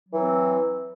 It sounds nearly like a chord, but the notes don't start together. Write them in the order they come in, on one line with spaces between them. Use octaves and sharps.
F#3 E3 C4